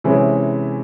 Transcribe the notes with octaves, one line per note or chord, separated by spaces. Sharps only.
C3 E3 G#3 C#4 E4